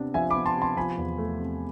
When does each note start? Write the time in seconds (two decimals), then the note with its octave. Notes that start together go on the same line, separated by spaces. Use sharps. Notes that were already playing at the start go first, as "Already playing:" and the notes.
Already playing: C3 B3 D4
0.14 F3 E5 G#5
0.30 B5 D6
0.36 B3
0.46 A5 C6
0.56 C3
0.62 A5 C6
0.77 F3 G#5 B5
0.98 E2
1.18 A3
1.39 C3